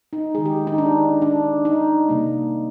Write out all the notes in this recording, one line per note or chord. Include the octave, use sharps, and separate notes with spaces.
D#4
D#3 G#3 G#4
G4
D#4
D4
D4
D#4
C3 G3 A#3